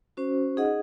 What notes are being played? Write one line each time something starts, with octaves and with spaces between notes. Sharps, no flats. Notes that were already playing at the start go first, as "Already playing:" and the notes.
C#4 F#4 C5
D#4 G#4 D#5 F#5